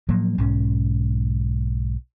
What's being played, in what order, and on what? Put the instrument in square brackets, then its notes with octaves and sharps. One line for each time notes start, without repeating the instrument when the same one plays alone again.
[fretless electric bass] A2 F3 F#3 A#3
B1 G#2 C#4